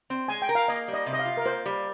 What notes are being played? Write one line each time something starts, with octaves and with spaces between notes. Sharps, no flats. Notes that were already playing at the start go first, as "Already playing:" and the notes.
C4
G#3 G#5
G5
A#4
F5
A#3 D#5
G3
D#5
C3
D#5
F5
F4
A#4
A#3 C5
G3